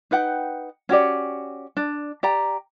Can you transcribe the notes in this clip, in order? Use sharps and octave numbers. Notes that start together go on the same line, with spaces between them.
D#4 B4 F#5 G5
C#4 F#4 G4 D5
D4
G4 D5 A#5